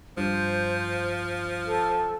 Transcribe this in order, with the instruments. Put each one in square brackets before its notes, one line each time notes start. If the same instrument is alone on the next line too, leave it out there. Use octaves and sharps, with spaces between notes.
[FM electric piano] G2 [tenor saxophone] F3 [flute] C5
[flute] A4